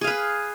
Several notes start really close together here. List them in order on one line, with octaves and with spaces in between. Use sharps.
G#4 F5 B4